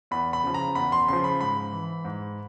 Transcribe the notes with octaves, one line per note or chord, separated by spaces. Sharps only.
E2 B5
B5
C#3 F3
A#5
E2 B5
C6
C#3 F3 C6
B5
G#2 B5
E3
G#2